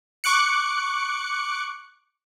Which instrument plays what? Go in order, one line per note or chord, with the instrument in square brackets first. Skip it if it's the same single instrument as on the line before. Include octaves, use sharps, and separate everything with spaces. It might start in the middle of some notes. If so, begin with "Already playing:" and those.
[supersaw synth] C#6 D6 F#6 C#7